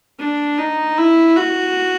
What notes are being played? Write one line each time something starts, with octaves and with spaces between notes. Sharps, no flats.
D4
D#4
E4
F#4